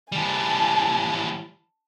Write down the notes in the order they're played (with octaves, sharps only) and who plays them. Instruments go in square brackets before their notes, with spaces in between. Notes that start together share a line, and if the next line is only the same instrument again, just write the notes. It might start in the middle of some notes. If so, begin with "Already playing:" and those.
[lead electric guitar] E3 G3 [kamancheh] G#5 A5